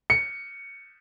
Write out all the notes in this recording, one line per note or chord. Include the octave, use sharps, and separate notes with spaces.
C#7